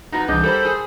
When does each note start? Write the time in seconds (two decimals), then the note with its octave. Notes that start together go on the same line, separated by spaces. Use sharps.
0.12 F2 B3 D#4 F#4 A#5 A#6
0.28 C2 E3 D4 G#4 D#5 G6
0.43 G3 G4 A4 A#4 C5 B5
0.65 G#4